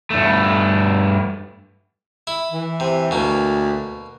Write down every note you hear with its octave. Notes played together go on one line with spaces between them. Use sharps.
G2 A3
E4
E3
C3
D2 B2 A#3